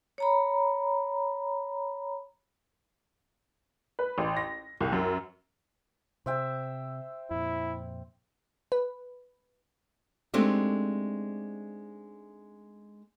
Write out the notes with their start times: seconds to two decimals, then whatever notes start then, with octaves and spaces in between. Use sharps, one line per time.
0.18 C#5 A#5 B5
3.99 B4
4.18 A1
4.37 A#6
4.81 C2
4.92 F#2
6.26 C3 C5 E5 G5
7.31 F2 A#2 E4
8.72 B4
10.34 G#3 A3 C4 D4 D#4 G4